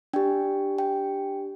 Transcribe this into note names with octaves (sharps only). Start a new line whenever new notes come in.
D4 G4 G5
G5